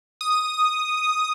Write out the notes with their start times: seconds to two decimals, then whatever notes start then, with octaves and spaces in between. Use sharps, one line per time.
0.21 D#6